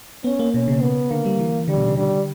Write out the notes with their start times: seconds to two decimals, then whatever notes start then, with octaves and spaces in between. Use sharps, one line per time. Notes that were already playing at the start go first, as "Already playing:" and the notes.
0.24 B3 C#4
0.39 A#3
0.54 B2 C#4
0.68 C#3
0.82 B3
1.10 D3 A#3
1.26 G3
1.39 E3
1.68 D3 G3
1.77 B2
1.87 C#3
1.97 D3 G3